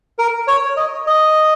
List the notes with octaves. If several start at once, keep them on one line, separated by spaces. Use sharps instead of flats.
A#4
C#5
D#5
D#5